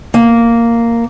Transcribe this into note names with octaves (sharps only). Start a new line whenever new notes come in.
A#3